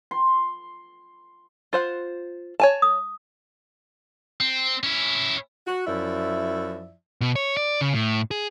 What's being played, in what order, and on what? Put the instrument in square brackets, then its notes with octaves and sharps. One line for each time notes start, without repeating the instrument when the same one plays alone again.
[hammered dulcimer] C6
[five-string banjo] F4 C5 F#5
C#5 G#5 A5
[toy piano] D#6
[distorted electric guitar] C4
C#4 E4
[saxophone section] F#4
F#2 F3 E4 D5 E5
[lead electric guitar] B2
C#5
D5
C#3
A2
G#4